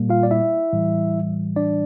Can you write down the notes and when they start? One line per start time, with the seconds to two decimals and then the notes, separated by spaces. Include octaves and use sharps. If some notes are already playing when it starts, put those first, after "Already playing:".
Already playing: A#2 G3 A#3
0.09 F4 F5
0.23 D5
0.31 E4 E5
0.73 A2 E3 G3
1.56 D4 D5